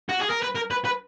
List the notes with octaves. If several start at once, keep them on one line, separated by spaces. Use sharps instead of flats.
F#4
G#4
A#4
B4
A#4
B4
B4